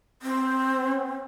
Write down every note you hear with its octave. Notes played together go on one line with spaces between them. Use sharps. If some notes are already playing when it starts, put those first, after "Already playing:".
C4